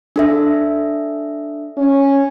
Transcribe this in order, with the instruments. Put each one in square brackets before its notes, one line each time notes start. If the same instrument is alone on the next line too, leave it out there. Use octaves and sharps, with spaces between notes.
[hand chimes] D4 A4 E5
[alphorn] C#4